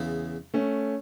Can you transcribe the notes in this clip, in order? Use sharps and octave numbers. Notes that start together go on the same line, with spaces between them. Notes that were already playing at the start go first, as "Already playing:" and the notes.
Already playing: E2 C#3 E3
A3 C#4